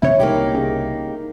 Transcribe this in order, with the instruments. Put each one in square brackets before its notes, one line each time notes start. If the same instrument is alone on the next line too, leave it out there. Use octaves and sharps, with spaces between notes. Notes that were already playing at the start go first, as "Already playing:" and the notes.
[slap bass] D#1 C3 B3 [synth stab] E4 C#5
[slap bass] C2 [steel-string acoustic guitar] A#3 D#4 G4
[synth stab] C#3